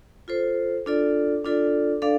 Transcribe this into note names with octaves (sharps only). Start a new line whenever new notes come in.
F4 A4 C5
D4 F4 A4 D5
D4 F4 A4 D5
D4 A4 D5 F5